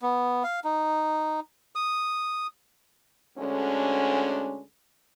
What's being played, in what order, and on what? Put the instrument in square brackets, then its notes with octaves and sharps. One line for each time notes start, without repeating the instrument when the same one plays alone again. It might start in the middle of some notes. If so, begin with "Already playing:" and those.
[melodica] B3
F5
D#4
D#6
[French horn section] D2 D3 G#3 C#4